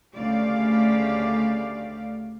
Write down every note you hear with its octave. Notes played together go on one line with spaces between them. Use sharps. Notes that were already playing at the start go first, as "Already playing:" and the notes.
D2 C#3 A3 G4 D5 F5